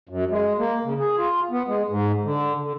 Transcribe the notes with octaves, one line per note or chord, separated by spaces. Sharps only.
F#2
G#3
A#3
C#3
G#4
F4
B3
G#3
G#2
D3
D3